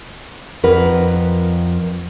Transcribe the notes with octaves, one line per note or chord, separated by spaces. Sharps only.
F2 A#4 B4 F#5